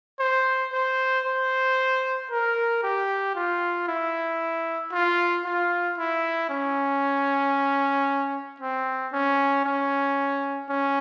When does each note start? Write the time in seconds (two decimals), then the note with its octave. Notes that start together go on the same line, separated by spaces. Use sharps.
0.20 C5
0.73 C5
1.25 C5
2.31 A#4
2.83 G4
3.36 F4
3.88 E4
4.92 F4
5.45 F4
5.98 E4
6.50 C#4
8.60 C4
9.13 C#4
9.65 C#4
10.69 C#4